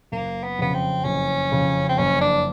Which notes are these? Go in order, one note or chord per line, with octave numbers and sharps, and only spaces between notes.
F#1 A#3
B3
F2 C#3 B3
C4
F#1 C#4
F2 C#3
C4
F#1 C#4
D4